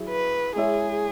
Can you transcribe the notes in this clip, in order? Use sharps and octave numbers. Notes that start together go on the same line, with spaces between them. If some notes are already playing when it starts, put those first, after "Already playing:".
Already playing: F#3 E4 G#4
B4
G#3 E4 G#4 C#5 E5